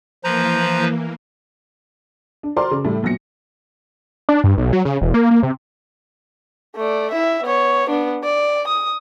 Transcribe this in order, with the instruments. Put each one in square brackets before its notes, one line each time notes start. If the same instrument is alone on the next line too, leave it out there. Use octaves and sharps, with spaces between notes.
[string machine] E3 A#3 [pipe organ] F3 B4 [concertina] C5 A#5
[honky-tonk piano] D4
F#4 A#4 C5 D5 C6 D6
C#3
A2 G3 A3
A#2 F#3 B3 A#6 C#7
[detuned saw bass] D4
G2
B1
F#3
C#3
E1
A#3
A#3
C3
[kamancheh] A3 D5
E4 E5
B3 C#5
B3 D4
D5
D#6